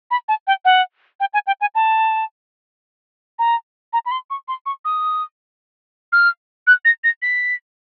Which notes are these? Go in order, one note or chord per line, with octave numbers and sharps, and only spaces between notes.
B5
A5
G5
F#5
G5
G#5
G5
G#5
A5
A#5
A#5
B5
C6
C#6
C6
C#6
D#6
F6
F#6
A#6
A#6
B6